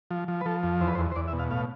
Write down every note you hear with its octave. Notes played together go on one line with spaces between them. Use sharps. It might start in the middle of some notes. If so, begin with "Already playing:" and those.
F3
F3
B4
F3 A4
F2
E2 C5
B4
C5
E2
C5
E2 D5
E5
B2
F5
A2 F5